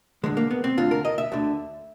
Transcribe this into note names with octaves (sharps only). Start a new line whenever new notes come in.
D2 D3 G#3
A#3
B3
C4
D2 D3 F4
A#4
D#5
E5
D2 D3